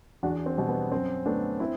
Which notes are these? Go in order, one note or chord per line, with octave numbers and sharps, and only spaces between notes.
E2 D4 F#4
C4
B2 G3
B3
F#2 C4
D3 A3 B3 D4
C4 E4